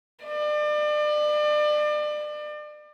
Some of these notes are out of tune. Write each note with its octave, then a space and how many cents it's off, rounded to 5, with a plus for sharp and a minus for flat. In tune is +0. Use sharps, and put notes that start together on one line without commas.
D5 +35